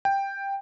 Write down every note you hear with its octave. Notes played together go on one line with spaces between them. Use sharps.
G5